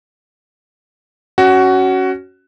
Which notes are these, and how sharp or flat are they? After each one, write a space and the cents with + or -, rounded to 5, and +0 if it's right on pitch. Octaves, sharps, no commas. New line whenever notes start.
C#4 +0 F#4 +15